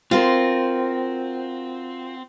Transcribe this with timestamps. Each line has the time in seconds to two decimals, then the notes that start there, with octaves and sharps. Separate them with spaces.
0.11 C4 F4 F#4 A#4